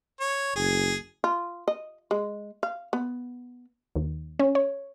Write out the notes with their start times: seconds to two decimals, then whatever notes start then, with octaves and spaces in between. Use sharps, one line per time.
0.20 C#5
0.56 F#1 G#4
1.24 F4
1.68 D#5
2.11 G#3
2.63 F5
2.93 B3
3.96 D#2
4.39 C#4
4.55 C#5